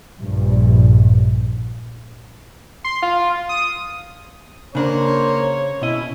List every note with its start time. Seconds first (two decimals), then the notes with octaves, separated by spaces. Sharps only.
0.20 A#1 G2
2.84 C6
3.02 F4
3.49 D#6
4.75 C#3 A#3 D4 C5 C#5
5.82 B2 C#4 E4 D#5